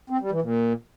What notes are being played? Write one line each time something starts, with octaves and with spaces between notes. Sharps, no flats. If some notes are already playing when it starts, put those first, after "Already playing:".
C4
G3
E3
A#2